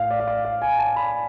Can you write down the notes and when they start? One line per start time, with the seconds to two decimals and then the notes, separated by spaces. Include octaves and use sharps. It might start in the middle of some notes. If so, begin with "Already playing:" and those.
Already playing: A2 F5
0.11 D5
0.20 F5
0.28 D5
0.45 F5
0.62 G#5
0.79 A5
0.96 B5